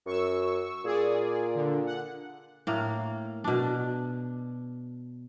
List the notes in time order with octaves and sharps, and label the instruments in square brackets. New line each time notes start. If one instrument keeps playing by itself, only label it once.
[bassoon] F#2 [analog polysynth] C#6 E6
[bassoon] A#2 [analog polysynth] G#4 D5
[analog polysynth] D3
F#5
[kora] A2 A#3
B2 D4